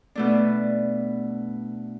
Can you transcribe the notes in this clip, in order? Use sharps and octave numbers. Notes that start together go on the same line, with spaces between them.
B2 A3 D4